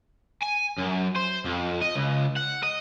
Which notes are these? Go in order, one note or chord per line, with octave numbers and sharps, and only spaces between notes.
G#5
F#2
C5
F2
D#5
C#2
F#5
D#5